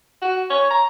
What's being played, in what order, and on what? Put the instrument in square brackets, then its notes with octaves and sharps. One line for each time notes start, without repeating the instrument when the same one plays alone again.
[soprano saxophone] F#4
C#5
A#5